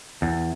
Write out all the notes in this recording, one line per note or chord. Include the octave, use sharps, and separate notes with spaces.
E2